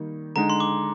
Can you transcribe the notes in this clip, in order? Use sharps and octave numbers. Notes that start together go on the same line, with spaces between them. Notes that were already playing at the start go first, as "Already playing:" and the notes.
Already playing: D#3 G3 A#3 D#4
D3 G#3 D#4 A#5
C6
D6